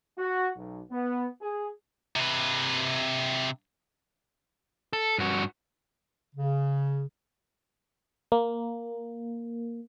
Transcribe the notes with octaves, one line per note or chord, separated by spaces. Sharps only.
F#4
B1
B3
G#4
C3 B4
A4
G2 F#4
C#3
A#3